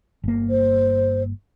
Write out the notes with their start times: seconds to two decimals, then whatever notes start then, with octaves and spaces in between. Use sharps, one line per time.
0.24 G1 A#3
0.50 C5